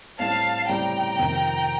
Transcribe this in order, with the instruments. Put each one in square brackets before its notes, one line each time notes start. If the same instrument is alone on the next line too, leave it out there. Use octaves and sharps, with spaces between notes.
[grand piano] A2 G3 C4 [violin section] F5 A5
[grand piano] A2 G3 C4 [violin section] G5 A#5
[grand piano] F2 C3 D#3